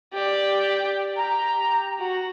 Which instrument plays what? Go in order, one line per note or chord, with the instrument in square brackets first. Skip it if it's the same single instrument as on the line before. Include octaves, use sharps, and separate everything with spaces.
[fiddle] G4 D5
[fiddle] G4 [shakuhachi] A#5
[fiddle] F#4